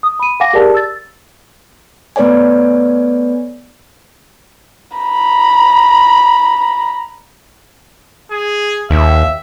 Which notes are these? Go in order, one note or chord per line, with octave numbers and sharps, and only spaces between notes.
D#6
B5 D#7
F5 F#5 G#5 D6 A#6
G4 G#4 A#4 D5 A5
E6 A6
A3 B3 B4 C#5 D5 G#5
A#5 B5
G#4
D#2 E5